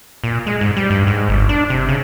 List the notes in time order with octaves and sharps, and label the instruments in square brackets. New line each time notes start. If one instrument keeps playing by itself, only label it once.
[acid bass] A#2
G#3
G#2
G3
G2
G#2
G1
D4
C3
C#3